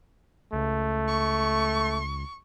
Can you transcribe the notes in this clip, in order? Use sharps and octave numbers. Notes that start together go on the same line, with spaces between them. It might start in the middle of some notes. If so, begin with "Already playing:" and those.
C#2 A3
C#6